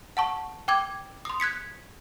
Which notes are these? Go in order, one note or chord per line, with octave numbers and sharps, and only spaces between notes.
F#5 A5 C#6
G5 D6 G#6
C6 D#6
F#6 G#6 B6 C#7